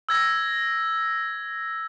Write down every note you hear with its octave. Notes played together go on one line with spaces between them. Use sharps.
E6 G#6 A#6